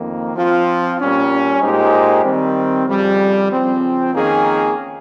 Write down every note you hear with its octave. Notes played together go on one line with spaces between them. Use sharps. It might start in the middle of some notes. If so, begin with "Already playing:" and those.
Already playing: F2 D#3 A#3
F3 C4 F4
A#2 G3 C#4
A#2 G#3 D#4 G4 C5
D#3 G3 C4
F2 C#3 G3
C#3 F3 C4
F2 D#3 A#3 C#4 G#4